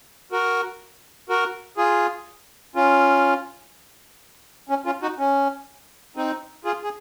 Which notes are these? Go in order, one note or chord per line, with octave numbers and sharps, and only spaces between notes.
F#4 A#4
F#4 A#4
F4 G#4
C#4 F4
C#4
C#4 F4
D#4 F#4
C#4
C4 D#4
F4 G#4
G#4